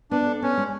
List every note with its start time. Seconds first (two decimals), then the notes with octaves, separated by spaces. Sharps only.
0.11 B3 D4
0.26 A4
0.42 B3 C#4
0.57 G#3